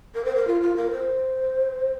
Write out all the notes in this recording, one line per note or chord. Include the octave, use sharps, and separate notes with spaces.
A#4
C5
A#4
F4
F4
A#4
C5